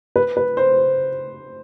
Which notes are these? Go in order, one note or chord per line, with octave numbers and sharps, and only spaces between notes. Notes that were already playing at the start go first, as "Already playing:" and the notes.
B4
B4
C5